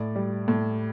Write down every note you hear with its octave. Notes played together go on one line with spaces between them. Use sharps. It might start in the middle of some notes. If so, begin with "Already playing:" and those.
Already playing: A2 D5
G3
A2